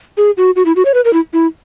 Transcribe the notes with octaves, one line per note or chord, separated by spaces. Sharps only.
G#4
F#4
F#4
E4
F#4
C#5
B4
A#4
E4
E4